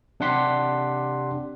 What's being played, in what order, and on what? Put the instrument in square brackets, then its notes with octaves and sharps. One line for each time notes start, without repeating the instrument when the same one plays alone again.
[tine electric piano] C3 D4 G4 F#5 C6 B6